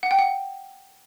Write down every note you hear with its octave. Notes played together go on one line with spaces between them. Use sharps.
F#5
G5
F#5